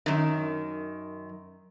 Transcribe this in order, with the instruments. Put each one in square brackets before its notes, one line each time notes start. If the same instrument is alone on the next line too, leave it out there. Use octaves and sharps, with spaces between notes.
[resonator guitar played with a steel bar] F#2 D#3